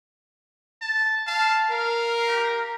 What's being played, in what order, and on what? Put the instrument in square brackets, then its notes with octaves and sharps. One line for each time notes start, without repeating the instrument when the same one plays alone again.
[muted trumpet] A5
[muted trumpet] F5 [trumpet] A5
[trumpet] A#4 [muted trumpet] F5
[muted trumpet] G4